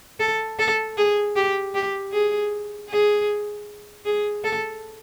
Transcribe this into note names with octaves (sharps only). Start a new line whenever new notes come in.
A4
A4
G#4
G4
G4
G#4
G#4
G#4
A4